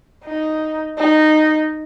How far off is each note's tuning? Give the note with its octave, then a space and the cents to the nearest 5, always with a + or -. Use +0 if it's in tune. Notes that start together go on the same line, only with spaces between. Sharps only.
D#4 +0
D#4 -10